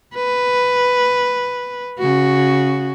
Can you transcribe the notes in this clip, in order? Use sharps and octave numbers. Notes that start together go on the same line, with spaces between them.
B4
C#3 F#4